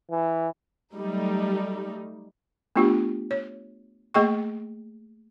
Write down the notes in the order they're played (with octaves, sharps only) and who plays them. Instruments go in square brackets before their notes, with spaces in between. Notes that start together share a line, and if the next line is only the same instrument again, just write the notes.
[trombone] E3
[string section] F#3 G3 A3 D#4
[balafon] A3 B3 D4 F4 G4
C#5
A3 A#3 G#4 D#5 G5 C#6